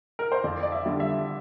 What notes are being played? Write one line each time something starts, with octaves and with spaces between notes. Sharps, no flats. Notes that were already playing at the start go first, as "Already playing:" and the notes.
A#4
C5
F2 D5
D5
E5
D3 G3
E5